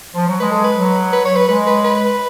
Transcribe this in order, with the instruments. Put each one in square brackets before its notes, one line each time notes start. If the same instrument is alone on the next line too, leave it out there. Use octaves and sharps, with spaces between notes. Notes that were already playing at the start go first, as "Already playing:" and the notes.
[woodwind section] F3
F#3
[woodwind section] G#3 [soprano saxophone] B4
[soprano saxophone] A4
B4
[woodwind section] F#3
[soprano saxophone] B4
C#5
B4
[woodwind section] G#3 [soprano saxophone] B4
[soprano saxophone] B4
B4